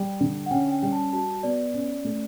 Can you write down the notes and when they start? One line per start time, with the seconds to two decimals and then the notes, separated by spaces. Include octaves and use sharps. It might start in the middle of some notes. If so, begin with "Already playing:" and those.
Already playing: G3 G5
0.20 D3
0.46 F#5
0.51 C#4 G5
0.71 G5
0.82 G3 G5
0.92 A5
1.12 F#4 A5
1.43 B3 D5
1.74 C#4
2.05 A3